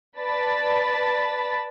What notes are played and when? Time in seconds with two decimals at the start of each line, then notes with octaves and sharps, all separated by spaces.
0.17 B4 D5 A5 B5 A6 B6